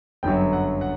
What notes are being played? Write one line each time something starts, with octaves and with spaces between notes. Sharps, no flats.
G1 F#2 D3 F#3 G5
F#5
F#5